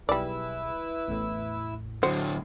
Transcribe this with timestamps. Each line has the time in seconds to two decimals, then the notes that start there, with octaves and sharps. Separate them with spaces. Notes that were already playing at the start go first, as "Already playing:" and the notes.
0.09 B1 G3 E4 G#4 B4 D5 E6
1.08 A1 E2 A2
2.03 A2 D3 F#4 C5 F#6